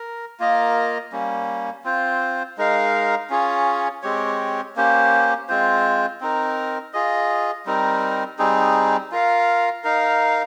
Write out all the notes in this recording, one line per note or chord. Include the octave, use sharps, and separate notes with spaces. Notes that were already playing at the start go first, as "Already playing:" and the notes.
Already playing: A#4
A#3 F4 A#4 D#5
G3 A#3 C#4
C4 F4 C5
G#3 D#4 A#4 F5
C#4 F4 G#4 C#5
G#3 C4 G4 C#5
A#3 C#4 G4 C5
G#3 C4 F4 C5
C4 D#4 A#4
F4 G#4 D#5
G3 C4 D#4 A#4
G3 C4 D#4 G#4
F4 A#4 F5
D#4 A#4 F5